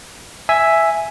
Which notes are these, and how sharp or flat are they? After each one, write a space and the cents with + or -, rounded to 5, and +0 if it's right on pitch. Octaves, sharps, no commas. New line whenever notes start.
E5 +0 G#5 +0